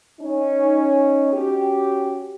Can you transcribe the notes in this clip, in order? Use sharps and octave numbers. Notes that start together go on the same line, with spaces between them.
C#4 D#4
C#4 F#4 G4